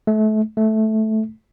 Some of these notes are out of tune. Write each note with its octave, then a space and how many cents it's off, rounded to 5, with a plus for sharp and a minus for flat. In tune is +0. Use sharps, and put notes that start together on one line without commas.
A3 -30
A3 -10